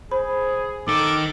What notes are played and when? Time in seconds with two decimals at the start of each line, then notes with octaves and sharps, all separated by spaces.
0.11 G#4 C5 B5
0.88 D#3 D#4 A4 D6